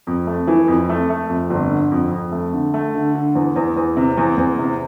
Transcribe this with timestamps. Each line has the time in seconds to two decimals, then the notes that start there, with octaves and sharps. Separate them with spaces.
0.07 F2
0.27 A3
0.47 E3
0.68 F2
0.89 A3
1.10 A3
1.29 F2
1.50 G1
1.71 D3
1.92 F2
2.11 F2
2.32 A3
2.53 D3
2.74 A3
2.95 D3
3.14 D3
3.35 E2
3.55 E2
3.76 E2
3.96 C3
4.17 E2
4.37 E2
4.59 C3